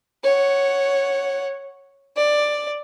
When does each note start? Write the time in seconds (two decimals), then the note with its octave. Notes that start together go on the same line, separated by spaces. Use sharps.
0.24 C#5 F#5
2.17 D5